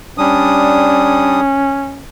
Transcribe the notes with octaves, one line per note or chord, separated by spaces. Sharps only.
G3 C#4 D4 D#6